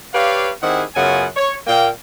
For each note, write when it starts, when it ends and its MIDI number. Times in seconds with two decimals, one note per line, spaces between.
0.14 0.50 67
0.14 0.50 71
0.14 0.50 73
0.14 0.50 74
0.14 0.50 77
0.63 0.83 51
0.63 0.83 60
0.63 0.83 64
0.63 0.83 67
0.63 0.83 68
0.63 0.83 78
0.95 1.26 42
0.95 1.26 49
0.95 1.26 59
0.95 1.26 65
0.95 1.26 78
0.95 1.26 80
1.36 1.55 73
1.67 1.89 46
1.67 1.89 58
1.67 1.89 77
1.67 1.89 79